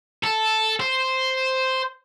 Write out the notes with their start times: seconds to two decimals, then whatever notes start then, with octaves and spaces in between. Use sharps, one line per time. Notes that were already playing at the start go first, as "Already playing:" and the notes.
0.23 A4
0.80 C5